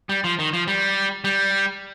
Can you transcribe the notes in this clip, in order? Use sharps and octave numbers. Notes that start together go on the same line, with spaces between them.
G3
F3
D#3
F3
G3
G3